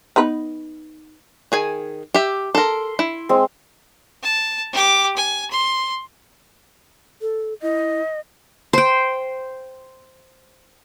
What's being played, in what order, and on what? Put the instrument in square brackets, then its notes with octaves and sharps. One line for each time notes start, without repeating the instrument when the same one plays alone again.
[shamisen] B3 D#4 B4
[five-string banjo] D#3 G#4 G#5
G4 E5
[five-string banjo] A4 A#4 [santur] C6
[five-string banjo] E4
[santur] G#3 C4
[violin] A5
G4 D6
G#5
C6
[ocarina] A4
[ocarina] E4 [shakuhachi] D#5
[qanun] C5 G5